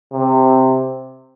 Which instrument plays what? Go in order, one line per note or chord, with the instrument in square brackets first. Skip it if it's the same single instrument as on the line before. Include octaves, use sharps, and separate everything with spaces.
[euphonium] C3